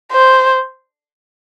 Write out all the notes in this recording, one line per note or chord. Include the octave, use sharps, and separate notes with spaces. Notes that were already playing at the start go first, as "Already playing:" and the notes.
C5